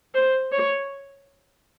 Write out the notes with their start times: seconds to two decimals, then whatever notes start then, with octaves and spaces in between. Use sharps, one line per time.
0.14 C5
0.52 C#5